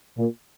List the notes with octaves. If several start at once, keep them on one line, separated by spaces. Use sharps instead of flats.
A#2